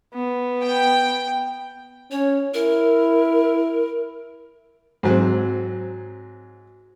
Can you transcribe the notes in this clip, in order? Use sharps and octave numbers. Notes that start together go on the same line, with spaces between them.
B3
G5
C#4 C#5
E4 A#4
G#2 F#3 C4